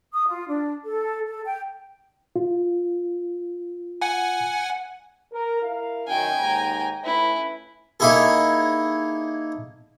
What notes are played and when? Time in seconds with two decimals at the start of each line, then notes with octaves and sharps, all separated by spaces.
0.14 D#6
0.28 F4
0.48 D4
0.85 A4
1.26 A4
1.45 G5
2.36 F4
4.01 F#5 G#5
5.33 A#4
5.62 E4 A#4 F5
6.08 F#2 D#3 G5 G#5
6.37 D#2 G#2 A#5
7.04 A3 C#4 E4 B4
8.00 A#3 D#4 E4 G#4 A4